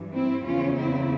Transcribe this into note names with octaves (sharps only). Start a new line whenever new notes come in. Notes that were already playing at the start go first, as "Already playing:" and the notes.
Already playing: G2 E3
C4 E4
E2 C#3 F3 C#4 F4
C4 E4